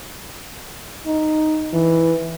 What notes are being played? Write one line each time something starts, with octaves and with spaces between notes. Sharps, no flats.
D#4
E3